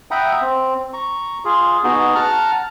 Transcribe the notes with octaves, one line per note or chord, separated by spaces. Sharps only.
E5 F#5 G5 A#5 B5 D#6
C4
A#5 C#6
F4 G#4
B3 D#4 F#4 G#4
F#5 A5 A#5 F6